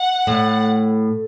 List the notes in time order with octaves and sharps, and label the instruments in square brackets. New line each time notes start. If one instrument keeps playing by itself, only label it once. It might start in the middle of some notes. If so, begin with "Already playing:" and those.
Already playing: [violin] F#5
[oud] A2